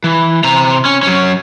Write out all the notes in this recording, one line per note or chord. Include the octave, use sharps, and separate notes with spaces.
E3
C3 A#5
C#4
F#3 C#4